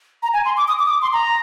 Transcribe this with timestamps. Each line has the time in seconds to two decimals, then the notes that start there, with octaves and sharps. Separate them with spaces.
0.23 A#5
0.33 G#5
0.45 C6
0.57 D6
0.68 D#6
0.79 D6
0.86 D#6
0.90 D6
1.02 C6
1.13 A#5